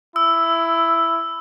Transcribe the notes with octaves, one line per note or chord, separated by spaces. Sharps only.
E4 E6